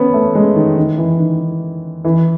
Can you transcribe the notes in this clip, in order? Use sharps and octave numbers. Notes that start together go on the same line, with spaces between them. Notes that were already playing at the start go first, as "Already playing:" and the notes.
Already playing: B3 C#4
A3
G#3
D#3
D#3
E3
D#3
E3